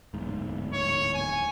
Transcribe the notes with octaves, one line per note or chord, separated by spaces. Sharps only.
D1 E2 G#2
C#5
G#5